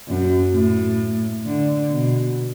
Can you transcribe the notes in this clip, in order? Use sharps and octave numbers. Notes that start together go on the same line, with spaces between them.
F#2
A2
D3
B2